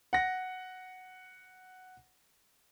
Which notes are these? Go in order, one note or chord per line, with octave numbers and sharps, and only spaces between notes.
F#5 A#6